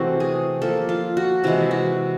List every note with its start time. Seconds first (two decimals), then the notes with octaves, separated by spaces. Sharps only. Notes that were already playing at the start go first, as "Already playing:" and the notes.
Already playing: C3 E3 A3 C4 F#4
0.20 G#4
0.62 F3 A#3 A4
0.89 F4
1.17 F#4
1.44 C3 E3 G#3 E4
1.71 F#4